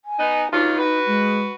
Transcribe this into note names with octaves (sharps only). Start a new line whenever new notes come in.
G#5
B3 D#4
G2 F#3 D#4 F4
F#4 B4
G#3